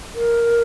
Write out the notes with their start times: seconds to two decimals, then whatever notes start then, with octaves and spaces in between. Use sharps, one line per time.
0.15 A#4